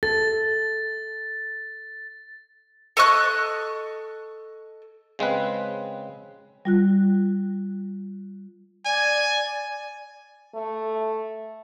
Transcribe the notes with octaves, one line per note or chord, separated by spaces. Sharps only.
A4 A6
A4 D#5 C#6 F#6
C#3 G#3 C4 B4
G3 F4 F#6
D5 G#5
A3